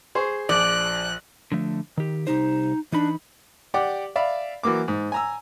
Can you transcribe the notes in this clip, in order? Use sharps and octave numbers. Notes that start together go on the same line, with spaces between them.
G#4 C5 C#6
A#1 F3 D5 F#6
D3 F3 A3
D#3 G4
C2 D#4 G4 C5
E3 D4 D#4 B5
G4 D5 F#5 D6
D5 E5 F5 B5
E3 F#3 A#3 D6
G#2
G#5 A#5 E6